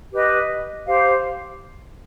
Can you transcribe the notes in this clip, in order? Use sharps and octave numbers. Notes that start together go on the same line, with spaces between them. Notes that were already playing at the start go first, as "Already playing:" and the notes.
G4 B4 D#5
G4 C5 F5